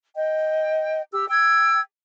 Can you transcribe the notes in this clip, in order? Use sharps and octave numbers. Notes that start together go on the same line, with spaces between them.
D#5 G5
G4 E6
G5 E6 G#6